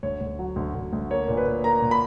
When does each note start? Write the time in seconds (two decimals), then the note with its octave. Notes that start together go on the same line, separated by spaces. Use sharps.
0.03 D2 C#5
0.21 D2
0.39 F#3
0.56 D2
0.74 D2
0.93 D2
1.10 A#3 C#5
1.28 A#2
1.37 B4
1.46 A#2
1.64 A#3 A#5
1.82 A#2
1.91 B5